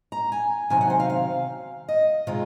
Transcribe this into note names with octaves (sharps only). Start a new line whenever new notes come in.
A#5
G#5
C3 D#3 F#3 G#5
F#5
C5
F5
F5
D#5
C3 D#3 G#3 F4